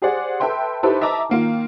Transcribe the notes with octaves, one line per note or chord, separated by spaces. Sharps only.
G4 G#4 C5 D5 F#5
A4 B4 E5 G5 C6
D#4 E4 G4 A4 B4 C5
D#5 E5 A5 A#5 D6
D#3 A#3 F4